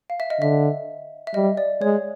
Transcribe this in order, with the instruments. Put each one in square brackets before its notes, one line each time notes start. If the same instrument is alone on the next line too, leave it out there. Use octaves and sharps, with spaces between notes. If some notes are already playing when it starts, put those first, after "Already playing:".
[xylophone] F5
E5
D#5
[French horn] D3 [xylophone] E5
[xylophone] E5
[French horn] G3 [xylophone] D#5
[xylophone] D5
[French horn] G#3 [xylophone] C#5